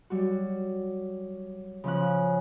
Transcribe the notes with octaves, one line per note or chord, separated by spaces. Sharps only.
F#3 G3 F#4
C#3 F3 C#4 F#6